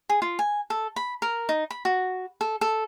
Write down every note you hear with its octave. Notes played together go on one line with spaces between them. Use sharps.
G#4
F4
G#5
A4
B5
A#4
D#4
B5
F#4
A4
A4